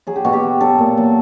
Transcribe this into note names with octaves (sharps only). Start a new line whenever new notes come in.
F#3 G#4
G4
B2 F#4
G4
F#3
F#3 A4
A#2
F#3